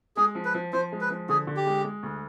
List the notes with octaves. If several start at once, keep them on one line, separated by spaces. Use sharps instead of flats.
G#3 G#4
F3
B4
F3
F3 C5
G#3
B4
F3
D3 G#4
D3
G4
G#3
G#3
D2